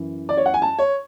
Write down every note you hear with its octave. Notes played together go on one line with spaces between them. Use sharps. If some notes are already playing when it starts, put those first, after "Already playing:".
Already playing: F#2 E3
D5
C#5
F#5
G#5
A5
C#5